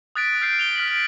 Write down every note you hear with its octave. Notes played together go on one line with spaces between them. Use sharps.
D#6 F#6 A6 B6 D7
F6 G6 C7 D7
F7 G7
F6 B6 F#7
D7